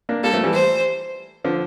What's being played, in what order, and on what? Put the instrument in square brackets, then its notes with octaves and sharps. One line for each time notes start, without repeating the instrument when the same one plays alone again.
[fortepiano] A#3 D4
[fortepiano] G3 A#3 [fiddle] A4
[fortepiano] F3 A3
E3 G3
[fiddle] C5
[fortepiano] D3 F3